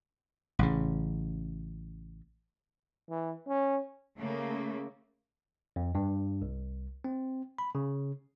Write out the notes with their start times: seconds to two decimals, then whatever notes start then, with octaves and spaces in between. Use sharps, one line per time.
0.59 A1 C#3
3.09 E3
3.48 C#4
4.18 C#3 A3 A#3
5.76 F2
5.95 G2
6.42 C2
7.04 C4
7.58 B5
7.75 C#3